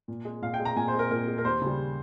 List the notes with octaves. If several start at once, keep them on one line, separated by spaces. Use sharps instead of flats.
A#2
G#3
A#2 F5
G5
G#3
A#5
A#2 G#5
C5
G#3
A#4
A#2 A#4
G#3
A#4
D#2 C5
C#3 G3